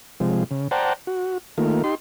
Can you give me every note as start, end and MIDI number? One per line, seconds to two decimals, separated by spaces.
0.20 0.44 48
0.20 0.44 53
0.20 0.44 56
0.51 0.68 49
0.71 0.93 72
0.71 0.93 74
0.71 0.93 78
0.71 0.93 79
0.71 0.93 81
0.71 0.93 82
1.07 1.38 66
1.58 1.83 51
1.58 1.83 57
1.58 1.83 58
1.58 1.83 65
1.84 1.95 63
1.84 1.95 67
1.84 1.95 84